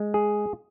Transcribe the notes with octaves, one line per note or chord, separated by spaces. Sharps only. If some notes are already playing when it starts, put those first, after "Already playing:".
Already playing: G#3
G#4